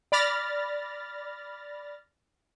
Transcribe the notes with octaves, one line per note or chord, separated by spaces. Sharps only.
D5 B5 F6 A6 A#6